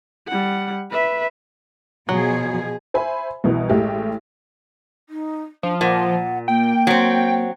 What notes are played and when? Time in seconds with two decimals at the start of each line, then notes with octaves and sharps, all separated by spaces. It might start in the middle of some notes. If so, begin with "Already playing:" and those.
0.27 G3 F#5
0.91 B4 E5
2.09 B2 F3 F#3 G#4
2.94 C5 E5 G#5 B5
3.44 C2 B2 E3
3.69 A1 A2 G#3 G4
5.09 D#4
5.63 F3 D4
5.81 A#2 F#5
6.48 A#3 G5
6.87 F#3 C4